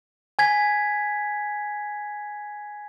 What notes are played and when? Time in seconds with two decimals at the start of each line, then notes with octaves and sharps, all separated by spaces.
0.39 G#5 G#6 B6